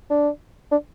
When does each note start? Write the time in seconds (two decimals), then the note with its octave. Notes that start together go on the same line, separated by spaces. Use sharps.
0.10 D4
0.71 D4